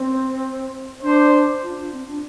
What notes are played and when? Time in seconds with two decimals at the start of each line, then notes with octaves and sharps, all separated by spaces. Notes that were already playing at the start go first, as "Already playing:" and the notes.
Already playing: C4
1.03 D4 C5
1.63 F4
1.77 D4
1.92 C4
2.07 D4